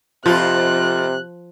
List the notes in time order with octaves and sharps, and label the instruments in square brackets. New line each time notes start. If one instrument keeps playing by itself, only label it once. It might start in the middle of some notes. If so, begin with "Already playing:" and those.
[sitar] F2 F4 [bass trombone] C3 [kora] F3 [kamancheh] F#6